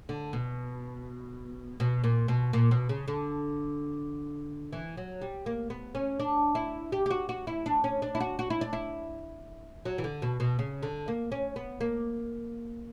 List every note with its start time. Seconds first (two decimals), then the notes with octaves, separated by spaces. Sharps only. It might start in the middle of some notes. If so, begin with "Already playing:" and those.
0.09 D3
0.33 B2
1.80 B2
2.04 A#2
2.28 B2
2.53 A#2
2.71 B2
2.89 C#3
3.08 D3
4.73 E3
4.97 F#3
5.21 G3
5.46 A#3
5.70 B3
5.95 C#4
6.20 D4
6.55 E4
6.92 G4
7.06 G4
7.11 F#4
7.29 F#4
7.47 E4
7.66 D4
7.84 C#4
8.02 D4
8.15 E4
8.20 F#4
8.39 F#4
8.50 E4
8.61 D4
8.73 E4
9.85 F#3
9.98 E3
10.04 D3
10.22 B2
10.40 B2
10.59 C#3
10.83 D3
11.08 A#3
11.32 C#4
11.56 B3
11.81 A#3